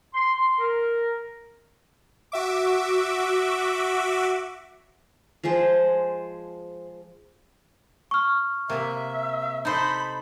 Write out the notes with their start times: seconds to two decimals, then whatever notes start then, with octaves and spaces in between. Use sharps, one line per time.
0.14 C6
0.59 A#4
2.32 F#4 E5 D6
5.44 F3 G#3 G#4 C5
8.11 C#6 F6
8.69 C3 A#3 E5
9.65 D#4 A4 C5 B5